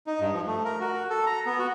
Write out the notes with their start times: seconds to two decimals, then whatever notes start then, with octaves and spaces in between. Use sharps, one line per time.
0.07 D#4
0.20 G2
0.33 F3
0.46 A3
0.65 A#4
0.81 F#4
1.10 A4
1.26 A#5
1.46 B3
1.59 F#4